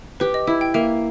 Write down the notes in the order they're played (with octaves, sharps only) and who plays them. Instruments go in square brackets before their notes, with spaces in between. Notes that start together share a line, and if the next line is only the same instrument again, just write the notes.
[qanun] G4 [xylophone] B4
[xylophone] D#5
[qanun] E4 [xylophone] E5
[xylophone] G5
[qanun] A#3 [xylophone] E5